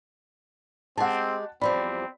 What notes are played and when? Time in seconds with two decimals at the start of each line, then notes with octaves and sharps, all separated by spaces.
0.97 G#3 C4 G4 F#5 A5
1.61 E2 F3 G3 C4 D5 B5